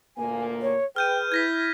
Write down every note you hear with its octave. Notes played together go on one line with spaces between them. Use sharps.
D2 A#2 A#3 G#5
C#5
G#4 B4 G5 F6 G6 D#7
E4 G#6 A#6 B6